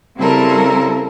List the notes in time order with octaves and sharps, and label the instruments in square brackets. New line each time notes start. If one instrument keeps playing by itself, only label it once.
[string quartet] C#3 G3 C4 E4 A4 A#4